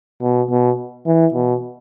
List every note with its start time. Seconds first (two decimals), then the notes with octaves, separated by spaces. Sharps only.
0.22 B2
0.51 B2
1.07 E3
1.34 B2